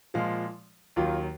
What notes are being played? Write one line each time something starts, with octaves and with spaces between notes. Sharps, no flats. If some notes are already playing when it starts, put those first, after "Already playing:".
A#2 F3 G#3 F5
D#2 D#3 F#3 F4